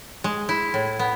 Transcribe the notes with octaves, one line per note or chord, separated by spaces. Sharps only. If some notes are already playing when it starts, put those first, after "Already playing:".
G#3
E4
A2
B3